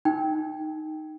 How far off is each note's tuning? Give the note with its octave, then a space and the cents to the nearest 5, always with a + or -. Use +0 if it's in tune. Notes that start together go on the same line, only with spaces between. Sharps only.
D#4 +0 G5 +0